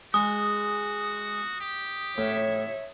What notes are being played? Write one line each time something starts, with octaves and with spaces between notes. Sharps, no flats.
G#3 F#4 D#6
G4
A2 C#5 E5